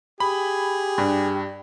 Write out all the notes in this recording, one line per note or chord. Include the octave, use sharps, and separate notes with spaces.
G4 G#4 B5
G2